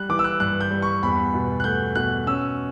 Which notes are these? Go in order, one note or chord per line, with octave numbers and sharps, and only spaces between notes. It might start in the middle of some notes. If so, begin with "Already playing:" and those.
Already playing: G3 F#6
E3 D6
E6
F#6
G2 F#6
G6
G3
C#6
E2 B5
B2
F#6
A3 G6
B2 F#6
C#4 E6